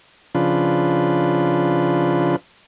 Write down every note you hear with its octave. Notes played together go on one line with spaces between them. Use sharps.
C#3 F3 D4 F4 B4